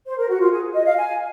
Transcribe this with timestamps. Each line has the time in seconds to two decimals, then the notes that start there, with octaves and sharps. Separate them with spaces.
0.06 C5
0.18 A#4
0.29 F#4
0.40 F4
0.51 G#4
0.74 D#5
0.85 F5
0.97 G#5